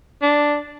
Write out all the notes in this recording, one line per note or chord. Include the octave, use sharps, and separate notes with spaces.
D4